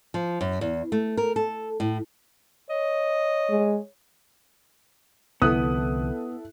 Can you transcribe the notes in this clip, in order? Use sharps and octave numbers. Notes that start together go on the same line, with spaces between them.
F3
F#2
E2
A3
A#4
A4
A2
C#5 D#5
G#3
C2 D3 F3 B3 E4 A4 D#6 F#6